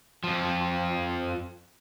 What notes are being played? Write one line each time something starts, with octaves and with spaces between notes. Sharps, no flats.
F2 F3